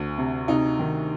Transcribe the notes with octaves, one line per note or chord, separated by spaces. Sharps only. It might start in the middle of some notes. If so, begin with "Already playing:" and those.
Already playing: D2
C3
C3 D#4
D#3